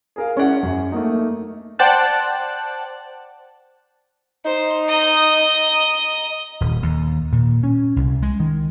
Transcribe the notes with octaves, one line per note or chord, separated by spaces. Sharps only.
G#4 A#4 F5
G#3 C#4 E4 G#4 D5 F#5
F#2
A3 A#3 D#4
C5 D5 F#5 G5 A5 F#6
D#4 C5
D#5 A#5
D#1
D#2
A#2
C#4
C2
G#3
D#3